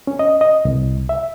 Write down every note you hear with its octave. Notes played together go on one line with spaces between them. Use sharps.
C#4
D#5
D#5
C2
E5